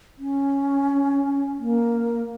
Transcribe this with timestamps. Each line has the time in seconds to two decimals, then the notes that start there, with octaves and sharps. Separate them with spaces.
0.19 C#4
1.59 A#3